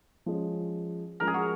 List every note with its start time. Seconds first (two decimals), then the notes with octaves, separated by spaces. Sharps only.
0.26 F3 G#3 C#4
1.20 F3 G#3 C#4 A#4
1.27 G#4
1.34 F#4